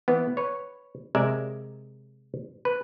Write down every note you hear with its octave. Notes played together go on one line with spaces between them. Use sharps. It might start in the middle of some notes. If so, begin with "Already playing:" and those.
E3 B3
B4 C#5
C3 G#3 A#4 D5 E5
B4